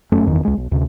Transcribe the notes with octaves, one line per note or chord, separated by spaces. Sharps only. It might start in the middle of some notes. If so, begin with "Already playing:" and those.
F1 F#2 A3 C#4
F#1 E2 D#3
C#2 G#3
B1
D2 C3